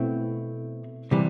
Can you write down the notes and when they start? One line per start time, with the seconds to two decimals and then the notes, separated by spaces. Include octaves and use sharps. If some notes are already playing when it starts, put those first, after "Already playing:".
Already playing: B2 A3 C4 E4
1.11 C3 E3 G3